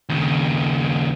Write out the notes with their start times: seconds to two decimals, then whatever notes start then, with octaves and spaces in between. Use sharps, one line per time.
0.09 D#2 C#3